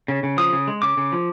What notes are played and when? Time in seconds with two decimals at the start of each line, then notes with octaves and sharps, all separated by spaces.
0.08 C#3
0.23 C#3
0.38 F3 D#6
0.53 C#3
0.67 G#3
0.82 C#3 D6
0.97 C#3
1.12 F3